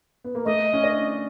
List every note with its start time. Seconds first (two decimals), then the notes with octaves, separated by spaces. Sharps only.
0.24 B3
0.35 A#3
0.45 A3 D#5
0.73 C#4
0.84 D4